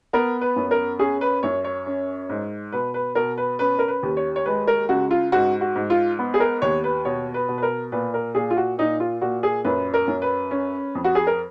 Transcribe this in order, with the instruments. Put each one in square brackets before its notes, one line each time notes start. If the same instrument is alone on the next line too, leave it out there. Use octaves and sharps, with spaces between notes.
[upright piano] B3 A#4
B4
F#2
A#4
C#4 G#4
B4
F#2 C#5
C#5
C#4
G#2
B2 B4
B4
B2 A#4
B4
C#4 B4
A#4
B4
D#2
C#5
C#5
G#3 B4
A#4
C#2 F#4
F4
G#2 F#4
F#4
G#2
F4
B3
G#4
A#4
D#2 C#5
B4
B2 C#5
B4
B2
B4
A#4
A#2 B4
A#4
A#2 G#4
F4
F#4
A#2 D#4
F4
A#2 F#4
G#4
F#2 B4
A#4
F#2
B4
C#4
F2
F#4
G#4
A#4